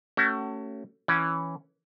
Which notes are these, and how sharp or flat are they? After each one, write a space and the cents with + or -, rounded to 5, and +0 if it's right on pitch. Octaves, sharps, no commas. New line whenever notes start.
A3 +25 C#4 +0 F#4 +40
E3 +0 C#4 +0 F#5 +0